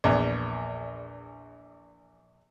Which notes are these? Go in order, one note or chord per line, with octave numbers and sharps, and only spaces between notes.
A#1 E2